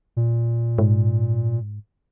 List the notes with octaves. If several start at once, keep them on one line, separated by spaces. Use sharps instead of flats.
A#2
G#2